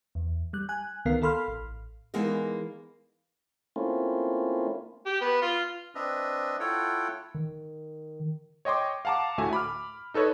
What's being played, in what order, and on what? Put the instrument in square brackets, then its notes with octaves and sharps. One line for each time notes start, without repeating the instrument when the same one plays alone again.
[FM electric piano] E2
G3 F#6
G#5 F#6
C#2 D#3 B3 A#4 F5 C7
A4 F5 B5 C6 F6
A1
[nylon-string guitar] E3 G#3 A#3 B3 D#4
[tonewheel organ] A3 A#3 C4 C#4 E4 F4
[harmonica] G4
B3
F4
[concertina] C4 D4 B4 D#5 E5
E4 F4 A4 C#5 F#5 G5
[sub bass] D#3
[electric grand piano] C#5 D#5 G5 C6 D6
F5 F#5 A5 A#5 D6
D2 A2 F#4 E5 G#5
B5 D6 F6
D#4 A4 B4 C#5 D#5